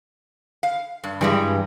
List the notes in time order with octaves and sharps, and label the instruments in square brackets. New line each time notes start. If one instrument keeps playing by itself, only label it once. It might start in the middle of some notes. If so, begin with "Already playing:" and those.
[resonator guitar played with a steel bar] F5
G2
[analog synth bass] G2 [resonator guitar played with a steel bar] E3 G3 G#3